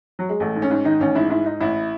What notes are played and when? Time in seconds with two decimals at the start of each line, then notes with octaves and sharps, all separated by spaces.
0.19 F#3
0.29 G#3
0.40 A1 A3
0.55 G#2
0.62 C#4
0.71 G#2
0.85 D#3 D#4
1.00 A1 C#4
1.15 G#2 E4
1.30 G#2 E4
1.46 G#2 D#4
1.60 A1 E4